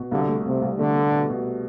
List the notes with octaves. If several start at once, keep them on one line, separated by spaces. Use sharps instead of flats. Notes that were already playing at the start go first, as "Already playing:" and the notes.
Already playing: B2
C2 D3
A3
C2 C3
C2
D3 A3
A3
B2
B2